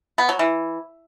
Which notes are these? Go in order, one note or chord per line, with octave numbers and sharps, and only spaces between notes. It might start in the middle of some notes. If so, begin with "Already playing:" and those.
B3
F#3
E3